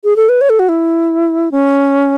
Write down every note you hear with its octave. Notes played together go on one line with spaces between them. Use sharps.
G#4
A4
B4
C#5
A4
F#4
E4
C#4